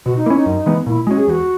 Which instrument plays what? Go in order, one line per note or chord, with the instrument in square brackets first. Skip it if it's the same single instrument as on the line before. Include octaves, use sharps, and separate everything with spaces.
[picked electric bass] B2 [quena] F#4
[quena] D#4
[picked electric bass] A#3 [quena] E4
[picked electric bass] C#4
[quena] D#4
[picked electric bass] F#2
E3 G#3 B3
[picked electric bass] A#2 [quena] E4
[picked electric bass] G#3 C#4 [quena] F#4
[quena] G#4
[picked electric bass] E2 [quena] F#4